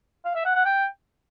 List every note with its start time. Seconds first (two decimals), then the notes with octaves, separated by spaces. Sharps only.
0.25 F5
0.35 E5
0.45 F#5
0.55 F#5
0.65 G5